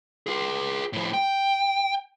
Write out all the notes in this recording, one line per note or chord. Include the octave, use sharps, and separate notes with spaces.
F4 G#4
A2 F3
G5